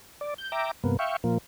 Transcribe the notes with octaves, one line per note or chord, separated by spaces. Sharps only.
D5
G6
E5 G5 A#5 D6
G2 C3 A#3 B3
E5 F5 G5 C#6
A#2 F3 A#3